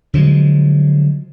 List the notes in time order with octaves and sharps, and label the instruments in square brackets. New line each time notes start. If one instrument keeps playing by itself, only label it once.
[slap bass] D3 F3 F#3 G#3